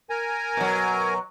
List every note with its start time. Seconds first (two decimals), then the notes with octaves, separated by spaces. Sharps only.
0.10 A#4 G#5 A#5
0.57 B2 F#3